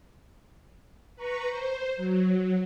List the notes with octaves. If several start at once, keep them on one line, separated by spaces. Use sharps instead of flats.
B4 A#5 C#6
C5
F#3